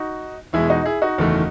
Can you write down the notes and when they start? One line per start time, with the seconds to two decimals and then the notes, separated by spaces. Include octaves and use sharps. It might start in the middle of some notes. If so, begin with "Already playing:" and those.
Already playing: D#4 F#4
0.53 E2 B2 G#3 E4 G#4
0.69 D#4 F#4
0.85 E4 G#4
1.02 D#4 F#4
1.18 F#1 E2 D#3 A3